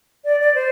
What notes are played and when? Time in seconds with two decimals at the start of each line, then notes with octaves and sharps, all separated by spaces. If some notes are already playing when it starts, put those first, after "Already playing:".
0.25 D5
0.40 D5
0.55 C5